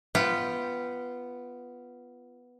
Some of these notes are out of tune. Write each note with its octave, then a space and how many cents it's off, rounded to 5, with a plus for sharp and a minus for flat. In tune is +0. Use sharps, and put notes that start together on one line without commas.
B3 +0 F4 -15 G5 -10